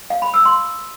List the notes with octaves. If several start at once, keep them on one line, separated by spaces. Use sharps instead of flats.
F5
B5
E6
C6